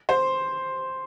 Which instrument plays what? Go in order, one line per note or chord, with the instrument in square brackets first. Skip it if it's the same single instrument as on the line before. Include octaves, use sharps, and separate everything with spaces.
[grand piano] C5